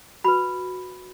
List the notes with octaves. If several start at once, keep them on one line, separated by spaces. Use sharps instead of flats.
F#4 B4 B5